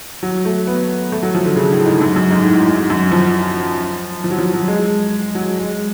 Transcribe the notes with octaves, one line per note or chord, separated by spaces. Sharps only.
F#3
A3
B3
A3
F#3
F3
D3
C#3
A2
G#2
F#2
F#2
G#2
A2
G#2
F#2
F3
F3
F#3
F3
F#3
G#3
F#3
G#3